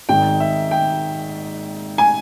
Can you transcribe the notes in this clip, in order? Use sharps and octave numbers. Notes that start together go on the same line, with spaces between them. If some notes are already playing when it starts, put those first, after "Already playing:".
G#1 G#2 D#3 G5
E5
G5
G#5